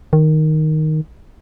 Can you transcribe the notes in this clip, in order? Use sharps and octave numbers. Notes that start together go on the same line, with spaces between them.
D#3